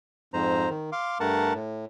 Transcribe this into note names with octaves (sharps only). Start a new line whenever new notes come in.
F2 G#2 C5 A#5
D#3
F5 C6 D6
G2 A3 A#4 F#5 A5
A2